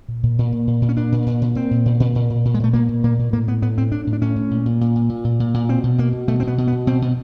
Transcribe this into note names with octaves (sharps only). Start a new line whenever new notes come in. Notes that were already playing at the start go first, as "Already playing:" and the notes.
A#2
A#2
A#2
A#2
A#2
A#2
C#4
A#2 D4
A#2
A#2
A#2
A#2 C4
A#2
A#2
A#2
A#2
A#2
A#2
G#3
A#2 A3
A#2 A#3
A#2
A#2 A#3
A#2
A2 A#3
A2 B3
A2 B3
A2 C4
A2 D4
A2
D4
A2 C#4
A2
A#2
A#2
A#2
A#2
A#2
A#2
A#2
A#2
B2 C4
B2
B2 A#3
B2
B2 A3
C4
B2 B3
B2
B3
B2
B2 C4
B2